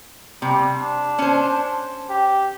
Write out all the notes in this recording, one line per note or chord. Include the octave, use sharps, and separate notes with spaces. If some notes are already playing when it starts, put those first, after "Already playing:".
C3 G3
D4
C#4 C5
G4